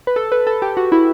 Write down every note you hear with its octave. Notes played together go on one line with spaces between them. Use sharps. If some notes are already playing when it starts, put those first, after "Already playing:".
B4
A4
B4
A4
G4
F#4
E4